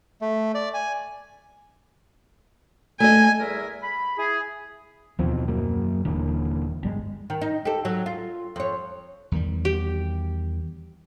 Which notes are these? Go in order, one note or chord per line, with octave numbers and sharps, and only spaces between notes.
A3
D5
G#5
A3 D#5 G#5
E2 G3 G#4 A#4 E5
B5
E4 G#4
D#2 B2 E3 F3 C4
F#2 F#3 A#3
D#1 D3 E3 A#3
G1 G3 G#3
D#3
D#4
G4 A4
F#3
F4
F2 C#5
E2 D#3 G3
G4